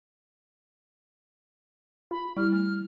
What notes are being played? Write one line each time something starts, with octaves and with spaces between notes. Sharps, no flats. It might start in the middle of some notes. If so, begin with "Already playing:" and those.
F4 B5
G3 E4 F6
A3 F6